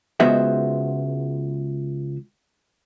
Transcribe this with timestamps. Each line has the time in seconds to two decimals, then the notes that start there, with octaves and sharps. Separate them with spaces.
0.20 C#2 G#3 B3 F#4 C5 E5